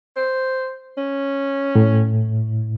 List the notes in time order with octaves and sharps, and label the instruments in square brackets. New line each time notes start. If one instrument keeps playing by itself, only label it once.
[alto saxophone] C5
C#4
[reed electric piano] A2